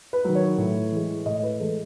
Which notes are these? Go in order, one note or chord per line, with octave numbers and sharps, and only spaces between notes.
B4
D#3 F#3
C#5
A2
E3 G#3
A2 D#5
B4
E3 G#3 A4